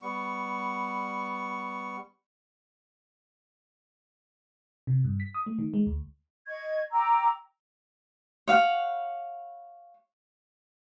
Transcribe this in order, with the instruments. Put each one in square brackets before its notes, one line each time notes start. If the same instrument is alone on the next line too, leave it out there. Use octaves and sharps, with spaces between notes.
[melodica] G3 B3 C#6
[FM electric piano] C3
G2
B6
D#6
A3
D#3
G#3
D2
[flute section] D#5 C#6 G#6
G5 A#5 D6 E6
[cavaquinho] C#5 F5 F#5